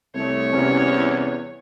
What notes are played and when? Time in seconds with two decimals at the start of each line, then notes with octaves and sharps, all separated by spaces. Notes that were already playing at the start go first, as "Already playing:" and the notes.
0.15 C2 A3 C#5
0.53 E2 C3 C#4